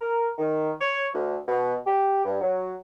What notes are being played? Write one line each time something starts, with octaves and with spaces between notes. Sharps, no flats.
A#4
D#3
C#5
D2
B2
G4
G2
F#3